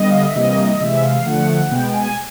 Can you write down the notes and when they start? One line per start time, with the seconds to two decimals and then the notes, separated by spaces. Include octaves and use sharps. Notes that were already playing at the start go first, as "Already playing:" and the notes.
Already playing: D3 G3 B3 D#5
0.11 F5
0.23 E5
0.35 C3 E3 G3 A#3 D#5
0.80 C3 E3 G#3 E5
1.03 F5
1.26 D3 F3 A3 F#5
1.71 B2 G#3 B3 G5
1.89 G5
1.94 G#5